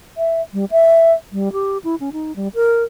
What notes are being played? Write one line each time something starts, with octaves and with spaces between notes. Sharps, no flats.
E5
G3
E5
G3
G4
E4
C#4
D#4
G3
A#4